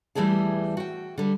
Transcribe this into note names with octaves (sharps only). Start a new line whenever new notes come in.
E2 E3 G3 A3 G#4 A5
F#4 G5
D3 G3